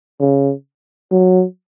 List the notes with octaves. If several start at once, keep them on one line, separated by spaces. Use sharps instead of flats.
C#3
F#3